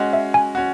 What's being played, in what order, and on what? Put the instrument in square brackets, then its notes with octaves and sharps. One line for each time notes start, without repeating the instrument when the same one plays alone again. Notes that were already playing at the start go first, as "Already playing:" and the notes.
Already playing: [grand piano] G#3 C#4 F#4
[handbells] E5
G#5
[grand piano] C#4 F#4